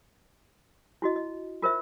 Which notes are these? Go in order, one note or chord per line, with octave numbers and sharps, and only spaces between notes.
E4 F#4 D#5
D#5
F4 A#4 C5 E5